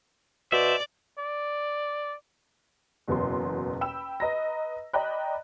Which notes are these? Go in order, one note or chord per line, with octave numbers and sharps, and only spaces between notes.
B2 C5 D5 E5
D5
F#1 E2 B2 C6
G5 B5 E6 E7
B4 D#5 A#5 A#6
D5 D#5 G5 A#5 B5 F#6